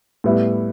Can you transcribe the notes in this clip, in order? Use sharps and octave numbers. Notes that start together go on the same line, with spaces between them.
A2 G3 B3 E4